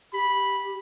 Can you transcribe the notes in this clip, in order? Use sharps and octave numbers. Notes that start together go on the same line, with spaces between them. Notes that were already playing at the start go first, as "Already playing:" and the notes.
G4 B5